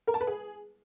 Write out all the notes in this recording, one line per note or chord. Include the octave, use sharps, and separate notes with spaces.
A#4
A5
B4
G#4